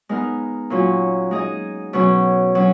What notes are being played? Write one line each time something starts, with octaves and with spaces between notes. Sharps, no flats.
G#3 B3 D#4 A#4
A#2 F#3 C#4 F#4
G#3 D#4 G#4 D#5
B2 F#3 C#4
F#3 C#4